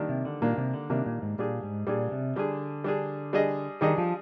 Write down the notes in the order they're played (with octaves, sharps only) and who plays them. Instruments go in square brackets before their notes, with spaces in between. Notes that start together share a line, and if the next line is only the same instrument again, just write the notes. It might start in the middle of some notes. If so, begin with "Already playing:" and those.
Already playing: [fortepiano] D#3 G3 A#3 D4
[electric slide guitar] C3
D3
[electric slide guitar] A#2 [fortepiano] D#3 G3 A#3 D4
[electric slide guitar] C3
D3
[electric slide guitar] C3 [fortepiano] D#3 G3 A#3 D4
[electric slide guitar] A#2
G#2
[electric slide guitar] A#2 [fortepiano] G3 D4 G#4
[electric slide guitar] G#2
[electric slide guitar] A#2 [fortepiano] G3 D4 G#4
[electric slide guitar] C3
[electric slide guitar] D3 [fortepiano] G3 D4 G#4
[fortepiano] G3 D4 G#4
G3 D4 G#4 D#5
[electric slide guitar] D#3 [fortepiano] G3 D4 G#4 D#5
[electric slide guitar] F3